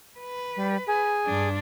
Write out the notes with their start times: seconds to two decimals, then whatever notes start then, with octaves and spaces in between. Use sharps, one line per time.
0.19 B4
0.56 G3
0.87 G#4
1.26 G2 D4